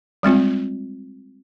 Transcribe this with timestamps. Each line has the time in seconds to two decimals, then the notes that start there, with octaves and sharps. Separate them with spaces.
0.23 G3 G#3 C4 F4